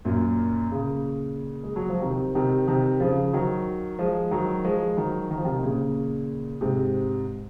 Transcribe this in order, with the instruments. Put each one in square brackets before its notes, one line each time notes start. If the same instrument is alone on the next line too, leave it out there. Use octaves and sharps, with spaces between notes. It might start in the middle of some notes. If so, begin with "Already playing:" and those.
[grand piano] F#2 A#2
A#2 C#3
G#3
F#3
F3
C3 D#3
C3 D#3
C3 D#3
C#3 F3
D#3 F#3
F3 G#3
D#3 F#3
F3 G#3
D#3 F#3
D#3
F3
C3 D#3
A#2 C#3
G#2 C3